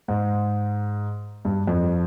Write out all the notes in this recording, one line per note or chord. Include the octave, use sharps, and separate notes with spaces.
G#2
G2
F2